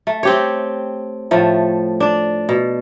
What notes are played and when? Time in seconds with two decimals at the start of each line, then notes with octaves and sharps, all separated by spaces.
0.07 A3
0.23 C4 G4 C#5
1.31 A2 F3 A3
2.00 D4 D5
2.49 B2